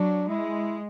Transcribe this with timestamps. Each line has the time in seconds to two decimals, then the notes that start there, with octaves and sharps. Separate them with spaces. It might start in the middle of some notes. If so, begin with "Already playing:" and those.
Already playing: F#3 D4
0.28 G#3 E4